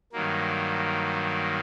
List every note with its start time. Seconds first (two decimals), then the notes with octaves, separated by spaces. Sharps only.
0.13 G2 D#3 F#3 A#3